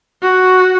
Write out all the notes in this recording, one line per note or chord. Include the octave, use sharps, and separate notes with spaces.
F#4